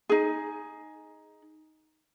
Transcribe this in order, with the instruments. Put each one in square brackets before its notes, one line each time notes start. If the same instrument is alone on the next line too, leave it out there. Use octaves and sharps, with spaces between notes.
[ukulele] D#4 G#4